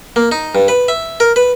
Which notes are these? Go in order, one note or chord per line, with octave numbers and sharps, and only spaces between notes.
A#3
D#4
G2
B4
E5
A#4
B4